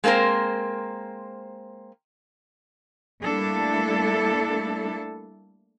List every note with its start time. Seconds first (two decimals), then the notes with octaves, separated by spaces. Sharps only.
0.04 G#3 A#3 C4 A#4 C5
3.22 G3 A3 A#3 D4 E4 A4